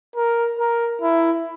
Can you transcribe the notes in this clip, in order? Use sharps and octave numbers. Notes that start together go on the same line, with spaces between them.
A#4
A#4
E4